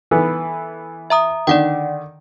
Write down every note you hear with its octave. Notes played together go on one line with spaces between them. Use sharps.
E3 B3 A4
E5 A#5 D#6
D3 D#3 D5 F#5 G5